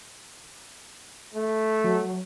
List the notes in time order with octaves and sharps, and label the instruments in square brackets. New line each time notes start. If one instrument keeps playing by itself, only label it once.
[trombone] A3
[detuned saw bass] F#3